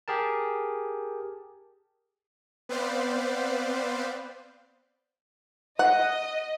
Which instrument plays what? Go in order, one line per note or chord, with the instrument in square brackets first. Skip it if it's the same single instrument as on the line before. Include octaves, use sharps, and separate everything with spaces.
[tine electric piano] G4 G#4 A#4 A5
[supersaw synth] B3 C4 B4 C5 D5 F5
[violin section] D#5 [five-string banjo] F#5